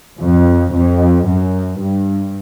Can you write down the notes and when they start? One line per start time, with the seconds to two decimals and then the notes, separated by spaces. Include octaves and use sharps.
0.20 F2
0.74 F2
1.27 F#2
1.80 G2